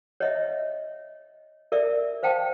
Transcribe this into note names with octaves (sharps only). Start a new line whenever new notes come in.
C#5 D#5 E5
A#4 D5 E5
C5 F5 G5 A5